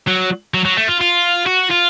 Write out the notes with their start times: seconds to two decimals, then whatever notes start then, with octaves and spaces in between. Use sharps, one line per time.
0.07 F#3
0.54 F#3
0.65 F#3
0.77 A3
0.88 F4
1.01 F4
1.46 F#4
1.71 F4